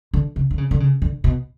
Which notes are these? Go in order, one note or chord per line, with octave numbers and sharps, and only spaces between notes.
D3
C#3
D3
C#3
D3
C#3
D3
B2